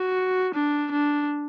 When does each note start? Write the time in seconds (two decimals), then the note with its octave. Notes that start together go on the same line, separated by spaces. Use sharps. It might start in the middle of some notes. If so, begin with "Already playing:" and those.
Already playing: F#4
0.55 D4
0.92 D4